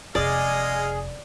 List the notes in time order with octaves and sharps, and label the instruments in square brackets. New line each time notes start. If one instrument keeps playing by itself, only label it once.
[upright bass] F1 C4 [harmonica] G#3 D#5 F5 [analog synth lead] G#4 [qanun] D5